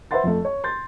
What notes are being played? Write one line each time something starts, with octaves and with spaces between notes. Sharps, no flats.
B4 C5 E5 F#5 C6 A6
F2 A3
C#5
C6 G6 A6